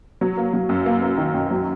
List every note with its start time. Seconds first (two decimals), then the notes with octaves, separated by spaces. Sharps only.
0.21 F#3
0.37 A#3
0.54 F#3
0.69 F#2
0.86 A#3
1.02 A#3
1.18 D#3
1.34 F#2
1.51 F#3